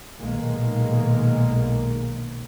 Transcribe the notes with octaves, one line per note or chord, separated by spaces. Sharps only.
B1 A#2 D#3 G#3 A#3